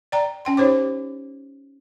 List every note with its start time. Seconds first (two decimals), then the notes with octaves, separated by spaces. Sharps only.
0.12 D5 G5 A#5
0.45 C#4 G5 C6
0.57 D#4 G4 C5 C#5 D6